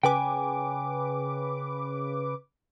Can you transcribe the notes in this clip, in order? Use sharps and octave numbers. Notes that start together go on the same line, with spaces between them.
C#3 B4 G5 G#5 D6